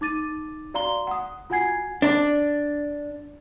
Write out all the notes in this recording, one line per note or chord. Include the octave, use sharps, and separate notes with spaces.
D#4 D6 A6 D#7
F#4 D5 F5 A#5 C6 G7
F#5 D#6
F4 F#4 F#5 G#5 G#6 C7
D4